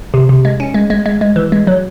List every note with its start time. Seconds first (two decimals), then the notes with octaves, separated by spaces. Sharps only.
0.14 C3
0.29 C3
0.45 G#3
0.60 C#4
0.74 G#3
0.90 G#3
1.06 G#3
1.21 G#3
1.36 E3
1.52 G#3
1.67 F#3